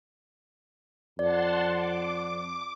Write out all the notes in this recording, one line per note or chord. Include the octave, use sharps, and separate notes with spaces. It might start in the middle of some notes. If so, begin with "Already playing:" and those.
F2 D5 F#5 A5 C6
D6